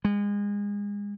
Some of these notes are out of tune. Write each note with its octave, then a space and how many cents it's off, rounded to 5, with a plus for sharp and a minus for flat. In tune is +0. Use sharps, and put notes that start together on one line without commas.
G#3 -30